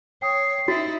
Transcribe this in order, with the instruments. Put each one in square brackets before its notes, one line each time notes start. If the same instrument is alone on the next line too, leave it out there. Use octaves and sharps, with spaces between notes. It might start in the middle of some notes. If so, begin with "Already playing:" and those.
[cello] C#5 [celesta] G5 D#6 [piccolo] C7
[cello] D#4 E4 [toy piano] F#4 [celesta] A6